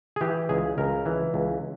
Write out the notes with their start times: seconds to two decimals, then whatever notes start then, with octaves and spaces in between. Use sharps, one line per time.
0.16 G#4
0.21 E3 G4
0.49 C#2 G#4
0.78 C#2 A#4
1.06 E3
1.34 C#2